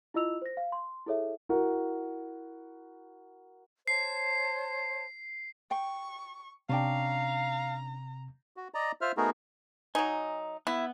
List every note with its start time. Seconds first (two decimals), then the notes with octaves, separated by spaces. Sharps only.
0.14 E4 F4 D#5 E6 F7
0.42 C5 A#6
0.57 F5
0.72 C6
1.06 E4 G#4 A4 C#5 E5
1.49 E4 F#4 A#4
3.88 C5 C#5 A5 C7
5.71 G5 C#6
6.69 C3 C#4 D4 F5 G5 A#5
8.57 F#4
8.74 D5 D#5 A#5
9.01 F4 C5 E5 F6
9.17 A3 B3 D#4 F#4 G#4 A#4
9.95 F#3 D#4 G#5
10.67 B3 E4